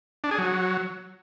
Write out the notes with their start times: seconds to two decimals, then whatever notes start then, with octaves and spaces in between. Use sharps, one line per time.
0.24 D4
0.31 G#4
0.38 F#3